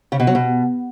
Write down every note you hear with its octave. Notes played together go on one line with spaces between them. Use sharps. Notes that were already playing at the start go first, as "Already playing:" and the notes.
C#3
B2
F#3
B2